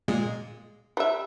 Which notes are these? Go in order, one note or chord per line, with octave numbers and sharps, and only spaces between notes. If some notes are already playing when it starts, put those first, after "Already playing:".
A#2 G#3
G3 E5